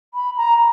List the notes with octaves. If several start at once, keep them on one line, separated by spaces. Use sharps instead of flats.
B5
A#5